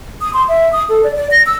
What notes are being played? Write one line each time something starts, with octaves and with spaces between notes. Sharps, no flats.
D#6
C6
E5
D#6
A4
D5
D5
A#6
E6